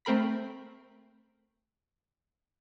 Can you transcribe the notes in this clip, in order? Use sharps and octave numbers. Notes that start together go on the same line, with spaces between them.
A3 C4 A#4 B5 B6